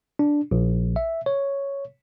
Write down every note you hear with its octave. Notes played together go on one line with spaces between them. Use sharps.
D4
A#1
E5
C#5